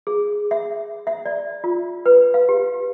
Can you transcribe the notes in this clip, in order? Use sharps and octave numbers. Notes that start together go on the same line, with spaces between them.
G#4
E5
E5
D5
F4
B4
F5
G4